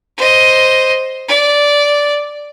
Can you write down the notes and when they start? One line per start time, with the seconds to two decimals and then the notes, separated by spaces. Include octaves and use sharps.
0.18 C5 D#5
1.28 D5